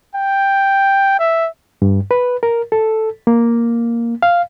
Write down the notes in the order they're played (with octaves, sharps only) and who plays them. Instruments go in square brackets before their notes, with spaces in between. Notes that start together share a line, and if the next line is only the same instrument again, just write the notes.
[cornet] G5
E5
[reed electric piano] G2
B4
A#4
A4
A#3
F5